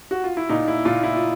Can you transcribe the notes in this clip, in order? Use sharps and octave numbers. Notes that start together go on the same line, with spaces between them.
F#4
F4
E4
A#2 D#4
E4
A#2 F4
E4
F4